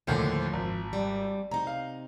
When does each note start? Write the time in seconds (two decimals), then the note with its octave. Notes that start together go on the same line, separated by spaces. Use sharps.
0.07 D#2 A2 D3 F3 C5
0.53 G#1
0.93 G3
1.51 C3 D#4 A#5
1.67 F5